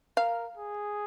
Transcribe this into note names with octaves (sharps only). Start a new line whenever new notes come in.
A#4 F5
G#4